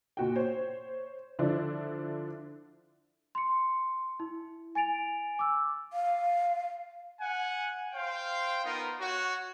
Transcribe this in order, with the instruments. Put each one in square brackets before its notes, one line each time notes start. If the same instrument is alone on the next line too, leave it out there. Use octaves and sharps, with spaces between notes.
[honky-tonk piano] A#2 F#4 G5
C5 C#5
D3 F3 D4 E4
[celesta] C6 C#7
E4
G#5 A6 D7 F7
D6 E6
[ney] F5
[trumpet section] F#5 G#5
C5 F5 G5
B3 D#4 F4 A#4
F#4 C#5